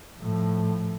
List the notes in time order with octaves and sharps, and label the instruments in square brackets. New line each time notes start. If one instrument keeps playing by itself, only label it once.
[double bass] A2 F3